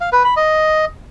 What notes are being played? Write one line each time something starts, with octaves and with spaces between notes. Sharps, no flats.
F5
B4
B5
D#5